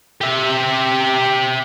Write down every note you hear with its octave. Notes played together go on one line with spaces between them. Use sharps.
G4 E5